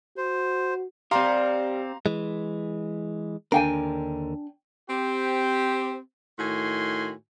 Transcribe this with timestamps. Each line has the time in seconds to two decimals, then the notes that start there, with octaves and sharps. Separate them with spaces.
0.17 F#4 C5
1.11 G3 C4 G4 A#4 F5 A#5 C6
2.06 E3 G#3
3.52 D#2 D3 D4 A#4 G5 G#5
4.90 C4 G4
6.39 A2 D#3 F#4 G#5 C6